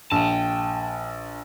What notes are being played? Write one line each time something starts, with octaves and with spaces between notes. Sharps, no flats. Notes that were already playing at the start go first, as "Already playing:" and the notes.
A#1 G5 A5